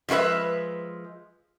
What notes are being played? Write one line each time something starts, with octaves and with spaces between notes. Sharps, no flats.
F3 G#3 F4 B4 E5